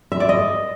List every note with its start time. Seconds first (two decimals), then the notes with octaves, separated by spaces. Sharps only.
0.12 E5
0.20 D5
0.29 D#5